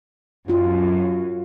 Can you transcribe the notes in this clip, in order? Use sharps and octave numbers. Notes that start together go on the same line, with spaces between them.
F#2 F4 F#4